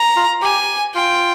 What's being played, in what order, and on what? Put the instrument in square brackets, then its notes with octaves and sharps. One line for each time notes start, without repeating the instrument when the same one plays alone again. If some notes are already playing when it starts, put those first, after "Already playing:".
Already playing: [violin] A#5
[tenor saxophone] F4
[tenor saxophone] G4 [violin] G#5
[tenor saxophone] F4 [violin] G5